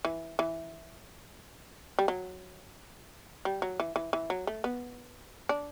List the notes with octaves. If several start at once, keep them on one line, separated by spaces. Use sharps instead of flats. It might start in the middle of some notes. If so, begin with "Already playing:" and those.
E3
E3
G3
F#3
G3
F#3
E3
E3
E3
F#3
A3
B3
D4